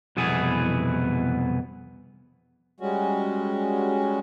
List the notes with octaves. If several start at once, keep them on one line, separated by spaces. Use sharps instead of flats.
C2 F2 B2 E3 B3 G#4
G3 G#3 C#4 F#4